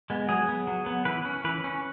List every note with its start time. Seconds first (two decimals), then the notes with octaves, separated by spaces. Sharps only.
0.10 G#3 B3
0.29 F#3 G#4
0.48 B3
0.67 F#3
0.86 B3
1.05 E3 B4
1.25 C#4
1.44 E3 B4
1.64 C#4